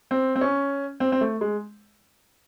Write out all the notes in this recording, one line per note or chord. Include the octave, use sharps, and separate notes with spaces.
C4
C4
C#4
C4
C4
A3
G#3